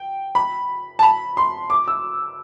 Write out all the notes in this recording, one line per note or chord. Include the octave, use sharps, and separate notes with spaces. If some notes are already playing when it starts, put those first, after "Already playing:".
Already playing: G5
B5
A5
B5
C6
D6
E6